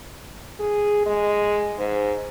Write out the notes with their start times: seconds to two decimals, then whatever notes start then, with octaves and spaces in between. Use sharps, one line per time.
0.60 G#4
1.06 G#3
1.78 G#2